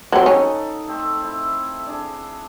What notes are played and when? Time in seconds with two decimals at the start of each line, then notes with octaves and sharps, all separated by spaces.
0.12 F#3 C4 D#4 A4 D#5
0.26 C#4 D#4 F#5
0.88 A3 C4 E5
1.21 C4 E4
1.87 D4 G#4